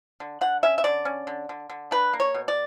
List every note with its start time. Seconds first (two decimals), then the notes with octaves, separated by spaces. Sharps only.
0.20 D3
0.41 D3 F#5
0.63 C#4 E5
0.78 E5
0.84 D3 D5
1.05 C#4
1.27 D3
1.49 D3
1.70 D3
1.91 D4 B4
2.13 A#3
2.20 C#5
2.35 B2
2.48 D5